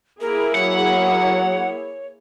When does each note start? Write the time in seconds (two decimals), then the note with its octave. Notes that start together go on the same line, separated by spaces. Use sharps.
0.21 A#3 E4 G#4 A#4
0.55 F#3 C#5 F#5